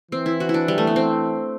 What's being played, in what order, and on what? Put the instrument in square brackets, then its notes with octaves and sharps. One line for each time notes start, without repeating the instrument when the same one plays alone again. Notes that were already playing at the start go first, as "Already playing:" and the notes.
[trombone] E3 [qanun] C4
[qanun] E4
F#4
E4
D4
G3
A3
B3
C4